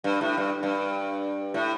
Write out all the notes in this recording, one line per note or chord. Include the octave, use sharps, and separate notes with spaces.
G2
A2
G2
G2
A2